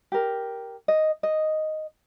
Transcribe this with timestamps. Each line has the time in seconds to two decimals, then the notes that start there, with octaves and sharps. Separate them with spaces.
0.12 G4 A#4
0.88 D#5
1.23 D#5